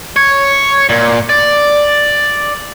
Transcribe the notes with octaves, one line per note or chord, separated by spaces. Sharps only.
C#5
A#2
D5